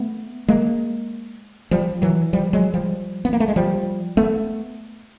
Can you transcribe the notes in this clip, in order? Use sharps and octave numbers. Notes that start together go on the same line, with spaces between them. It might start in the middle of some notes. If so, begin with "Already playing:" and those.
Already playing: A3 B3
G#3 A#3
F3 G3
E3 F#3
F3 G3
F#3 G#3
F3 G3
B3
A#3
A3
G#3
F3 G3
A3 B3